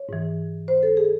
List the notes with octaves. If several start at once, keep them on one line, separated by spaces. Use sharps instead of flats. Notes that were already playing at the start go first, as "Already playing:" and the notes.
Already playing: C#5
G#2 E3
C5
A4
G#4